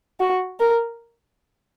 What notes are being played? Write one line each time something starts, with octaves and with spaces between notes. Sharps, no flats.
F#4
A#4